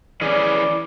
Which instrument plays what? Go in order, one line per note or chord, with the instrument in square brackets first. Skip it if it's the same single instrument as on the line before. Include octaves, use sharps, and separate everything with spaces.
[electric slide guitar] E3 C#4 G#4 [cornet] D5